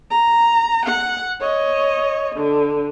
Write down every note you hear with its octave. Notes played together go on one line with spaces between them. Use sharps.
A#5
F#5
C#5 D#5
D3